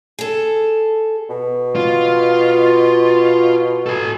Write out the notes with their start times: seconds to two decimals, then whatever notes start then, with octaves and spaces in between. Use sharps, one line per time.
0.19 G#4 A4
1.30 B2
1.75 F4
3.86 A4 G#5